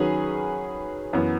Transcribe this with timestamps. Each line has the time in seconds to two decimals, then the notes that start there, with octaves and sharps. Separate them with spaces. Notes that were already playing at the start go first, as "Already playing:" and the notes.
Already playing: D#3 F#3 C#4 G#4 B4
1.13 F#2 E3 B3